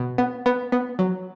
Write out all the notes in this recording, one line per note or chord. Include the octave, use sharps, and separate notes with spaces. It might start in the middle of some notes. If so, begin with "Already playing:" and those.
Already playing: B2
B3
B3
B3
F#3